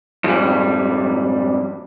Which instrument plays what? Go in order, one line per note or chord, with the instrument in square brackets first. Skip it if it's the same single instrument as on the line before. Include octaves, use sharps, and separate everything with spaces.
[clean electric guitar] F2 G#2 G3